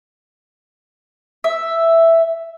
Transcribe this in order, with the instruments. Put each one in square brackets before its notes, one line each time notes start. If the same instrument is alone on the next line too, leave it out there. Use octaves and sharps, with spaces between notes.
[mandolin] E5